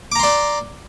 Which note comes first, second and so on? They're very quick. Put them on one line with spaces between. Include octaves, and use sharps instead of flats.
D6 A#5 C6 D5